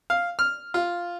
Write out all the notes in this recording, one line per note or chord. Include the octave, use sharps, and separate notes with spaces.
F5
F6
F4